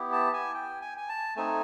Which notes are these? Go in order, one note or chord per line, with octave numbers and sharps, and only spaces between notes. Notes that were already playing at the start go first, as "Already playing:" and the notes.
Already playing: B3 E4 G4
A5
G#5
G5
G#5
G#5
A5
A3 C4 D#4 G#5